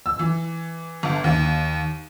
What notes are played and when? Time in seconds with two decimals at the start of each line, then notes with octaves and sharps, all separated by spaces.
0.06 E6
0.19 E3
1.03 G1
1.24 D#2